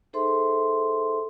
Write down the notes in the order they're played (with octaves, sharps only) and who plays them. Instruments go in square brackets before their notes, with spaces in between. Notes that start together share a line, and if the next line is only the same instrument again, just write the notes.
[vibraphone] D#4 G#4 A4 C5 E5 C6